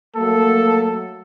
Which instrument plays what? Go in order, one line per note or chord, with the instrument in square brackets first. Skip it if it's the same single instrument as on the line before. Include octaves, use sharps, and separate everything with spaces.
[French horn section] F#3 A3 A#3 [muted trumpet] A4